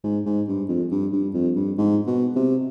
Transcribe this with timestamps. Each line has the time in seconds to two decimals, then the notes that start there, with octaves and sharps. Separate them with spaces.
0.04 G#2
0.26 G#2
0.48 G2
0.68 F2
0.91 G2
1.12 G2
1.34 F2
1.56 G2
1.78 G#2
2.07 B2
2.36 C3